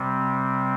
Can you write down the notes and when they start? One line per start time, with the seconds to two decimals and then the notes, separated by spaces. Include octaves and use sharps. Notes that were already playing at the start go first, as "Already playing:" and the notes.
Already playing: C3 G3 C4